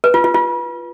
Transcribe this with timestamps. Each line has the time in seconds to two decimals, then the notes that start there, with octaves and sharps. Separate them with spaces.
0.04 B4
0.14 F4
0.24 F4
0.34 F4